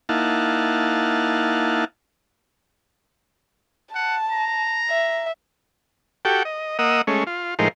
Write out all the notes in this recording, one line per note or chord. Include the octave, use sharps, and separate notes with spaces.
A#3 D#4 E4 F5 F#5 A5
F#5 A5
A#5
E5
F#4 G4 A4 G5
D#5
A#3 D#5 F#5 D#6 E6
G#3 A3 C#4
F4
A2 F3 G#3 D#4 A#4 C5